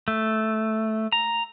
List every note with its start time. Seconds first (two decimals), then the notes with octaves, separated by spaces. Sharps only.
0.08 A3
1.12 A#5